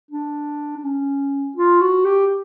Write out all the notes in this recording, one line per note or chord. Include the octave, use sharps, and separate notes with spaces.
D4
D4
C#4
F4
F#4
G4